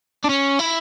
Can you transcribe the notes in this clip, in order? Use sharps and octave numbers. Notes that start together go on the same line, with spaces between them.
D4
C#4
E4